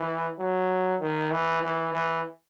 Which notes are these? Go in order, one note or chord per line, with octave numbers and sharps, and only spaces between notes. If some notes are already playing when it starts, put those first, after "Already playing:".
Already playing: E3
F#3
D#3
E3
E3
E3